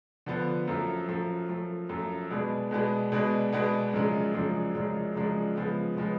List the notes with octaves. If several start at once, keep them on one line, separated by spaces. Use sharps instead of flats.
D3 F3 B3
F#2 F3 A3
F#2 F3 A3
F#2 F3 A3
F#2 F3 A3
B2 G#3 B3 D4
B2 G#3 B3 D4
B2 G#3 B3 D4
B2 G#3 B3 D4
F#2 C#3 F3 G#3 D4
F#2 C#3 F3 G#3 D4
F#2 C#3 F3 G#3 D4
F#2 C#3 F3 G#3 D4
C#3 F3 G#3 B3
C#3 F3 G#3 B3